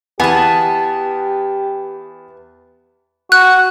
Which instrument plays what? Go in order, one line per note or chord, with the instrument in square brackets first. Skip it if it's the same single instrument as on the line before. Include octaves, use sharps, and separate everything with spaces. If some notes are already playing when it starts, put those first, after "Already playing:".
[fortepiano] E2 G#4 [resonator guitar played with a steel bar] B3 [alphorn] G4 [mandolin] G#5 A5
[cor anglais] F#4 [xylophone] F#6